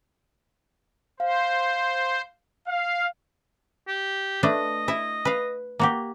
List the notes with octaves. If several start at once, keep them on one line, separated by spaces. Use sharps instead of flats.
C5 F5
F5
G4
A3 D4 B4 D#5
E4 E5
B4 F5
A#3 F#4 G4